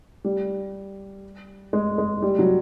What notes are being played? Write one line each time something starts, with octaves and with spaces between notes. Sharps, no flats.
G3
G#3
G#3
G3
F#3